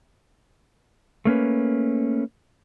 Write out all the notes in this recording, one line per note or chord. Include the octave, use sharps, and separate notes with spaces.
A3 A#3 C#4 B4